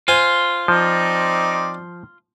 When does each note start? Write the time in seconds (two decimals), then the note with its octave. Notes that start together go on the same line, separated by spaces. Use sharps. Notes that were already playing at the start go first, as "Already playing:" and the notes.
0.08 F4 C5 G#5
0.68 F3 C4 D#4 D5